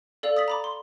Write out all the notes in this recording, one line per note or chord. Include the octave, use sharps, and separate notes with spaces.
A4 D5 F5 E6 F7
D#6 A6 B6 F#7
A#5 B5 D6
C6